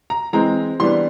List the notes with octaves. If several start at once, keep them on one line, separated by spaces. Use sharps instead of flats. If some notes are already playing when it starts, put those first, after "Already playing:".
A#5
E3 G#3 C4 A#5
E3 G3 B3 D4 C6